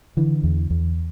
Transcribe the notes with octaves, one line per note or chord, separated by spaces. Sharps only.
D3 E3
E2
E2